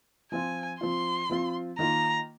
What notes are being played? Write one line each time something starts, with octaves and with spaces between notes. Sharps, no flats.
F3 C4 F4 G#5
F3 C4 F4 C6
F3 C4 F4
D#3 A#3 F4 A#5